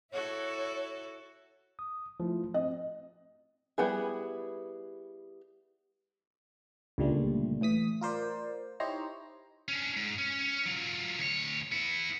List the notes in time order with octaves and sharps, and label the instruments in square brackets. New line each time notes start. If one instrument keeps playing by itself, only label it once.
[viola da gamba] E4 F#4 A4 [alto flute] C#5
[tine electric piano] D#6
F3 A3 E4
[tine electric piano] C4 [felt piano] D#5
[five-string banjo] G3 B3 E4 G#4
[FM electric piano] C#2 A#2 D3 G3 A3
A2 E3 D#6 B6
F4 A#4 C5 D5
D#4 E4 G4 C5 C#5 A#5
[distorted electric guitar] C#4 D4
G#2
C#4
F#3 F4
D2 C#5
B3 E4